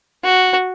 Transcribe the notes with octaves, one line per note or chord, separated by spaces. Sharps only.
F#4